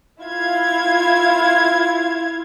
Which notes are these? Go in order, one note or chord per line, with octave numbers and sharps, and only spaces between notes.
E4 F4 F5 G#6